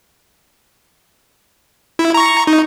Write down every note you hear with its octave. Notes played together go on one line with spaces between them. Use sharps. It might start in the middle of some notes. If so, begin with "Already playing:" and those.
E4
A#5 C#6
D#4